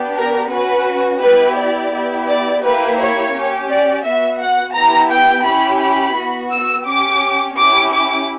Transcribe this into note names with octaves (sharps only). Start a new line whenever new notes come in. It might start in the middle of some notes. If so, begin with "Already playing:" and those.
Already playing: B3 D4 G4
A#4
C#4 F#4 B4
B3 E4 G4 B4
D5
B3 E4 G4
D5
A#3 E4 G4 B4
C#5
C#4 G4
D5
B3 F#4 E5
F#5
B3 E4 G4 A#5
G5
C#4 E4 G4 B5
B5
B3 F#4
E6
C#4 G4 D6
C#4 E4 G4 D6
D6